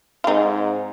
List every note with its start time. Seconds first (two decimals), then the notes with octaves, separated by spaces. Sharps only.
0.24 F4
0.27 G#2 C4 D#4